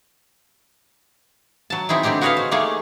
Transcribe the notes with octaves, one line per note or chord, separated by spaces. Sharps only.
F#3 A5
C4 D#4 E4 G#4 G5
D3 C4 E4 G4 G5
F#4 G#4 B4 C#5 D#5 F5
C5
A3 A#3 D#4 G4 G#4